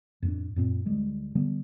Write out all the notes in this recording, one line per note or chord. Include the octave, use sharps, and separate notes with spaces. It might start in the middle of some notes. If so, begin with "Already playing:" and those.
F2 A2 B3 D4
F#2 A#2 C4
D2 G3 G#3
D3 G3 B3